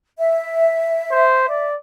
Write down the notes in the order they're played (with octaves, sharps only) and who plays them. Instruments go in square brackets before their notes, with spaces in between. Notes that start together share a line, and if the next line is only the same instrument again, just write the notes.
[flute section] E5
[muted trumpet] C5
D5